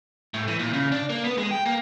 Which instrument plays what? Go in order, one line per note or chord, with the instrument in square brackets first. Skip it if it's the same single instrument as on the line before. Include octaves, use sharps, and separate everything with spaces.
[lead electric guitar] A2
E3
A#2
C#3
D4
A#3
B3
G#3
G5
A#3